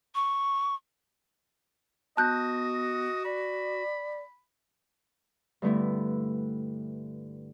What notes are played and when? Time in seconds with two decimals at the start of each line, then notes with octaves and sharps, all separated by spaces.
0.15 C#6
2.17 B3 F#4 D#5 A5 F#6 G6
3.25 D5 B5
5.62 G2 D3 A3 B3 E4